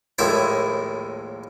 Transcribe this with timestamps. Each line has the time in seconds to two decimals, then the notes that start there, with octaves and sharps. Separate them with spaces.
0.19 A#1 D#2 A2 G#3 E4 C5